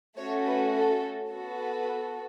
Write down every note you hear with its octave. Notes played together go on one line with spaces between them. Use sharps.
A3 C#4 F#4 C#5
B4
A4
B3 F#4 A4
B4